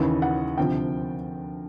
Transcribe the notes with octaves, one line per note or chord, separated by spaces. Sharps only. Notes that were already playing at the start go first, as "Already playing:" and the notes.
Already playing: D#2 C#3 E3
F#5
D2 C3 F3 G5